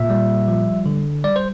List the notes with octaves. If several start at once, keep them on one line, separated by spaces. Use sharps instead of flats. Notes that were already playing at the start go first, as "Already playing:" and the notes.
Already playing: A#2 E5
G3
F3
D3
G3 D5
C5